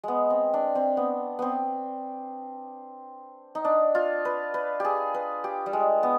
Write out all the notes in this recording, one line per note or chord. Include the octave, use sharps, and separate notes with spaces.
G#3 B3
C4
D4
C4
B3
B3 C4
D#4
D4
F4
B4
B4
G4 G#4
B4
G4
G3
G#3
B3